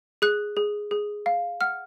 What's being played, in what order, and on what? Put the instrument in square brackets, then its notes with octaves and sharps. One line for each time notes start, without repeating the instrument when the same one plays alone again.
[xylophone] G#4 F#6
G#4
G#4
F5
F#5 F6